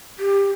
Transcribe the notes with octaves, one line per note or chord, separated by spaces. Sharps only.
G4